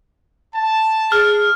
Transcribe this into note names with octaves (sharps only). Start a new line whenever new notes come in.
A5
G#4 F6